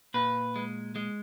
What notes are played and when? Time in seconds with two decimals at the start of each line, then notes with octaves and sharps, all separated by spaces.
0.14 A#2 B4
0.56 G#3
0.96 G#3